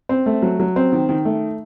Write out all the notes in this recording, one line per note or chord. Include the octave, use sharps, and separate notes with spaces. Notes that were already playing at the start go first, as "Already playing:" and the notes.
C4
A3
F#3
F#3
C4
D#3
D#3
A3